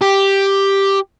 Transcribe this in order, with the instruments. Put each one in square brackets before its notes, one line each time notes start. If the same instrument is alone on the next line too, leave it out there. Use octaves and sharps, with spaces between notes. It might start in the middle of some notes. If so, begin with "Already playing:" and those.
[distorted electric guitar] G4